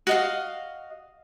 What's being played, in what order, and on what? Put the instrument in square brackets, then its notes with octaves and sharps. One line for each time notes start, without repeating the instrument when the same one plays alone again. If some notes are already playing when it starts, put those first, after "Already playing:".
[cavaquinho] F#4 D#5 F5